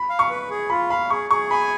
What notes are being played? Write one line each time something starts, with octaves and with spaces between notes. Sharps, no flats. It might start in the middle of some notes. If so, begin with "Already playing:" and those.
Already playing: B5
F5
C#6
B4
G#4
F4 B5
F5 B5
G#4 C#6
G#4 C#6
G#5 B5